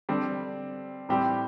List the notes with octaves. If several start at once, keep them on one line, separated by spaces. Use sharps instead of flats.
D3 G3 C4
A2 G3 C4 G4